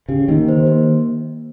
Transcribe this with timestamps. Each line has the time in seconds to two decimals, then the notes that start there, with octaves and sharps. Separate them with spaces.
0.08 C#3 G4
0.28 D#3 A#3
0.48 C5
0.67 A#3